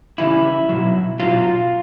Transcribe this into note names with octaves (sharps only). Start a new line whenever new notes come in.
C#3 E3 G3 E4
B2 F#3
B2 F#3 F4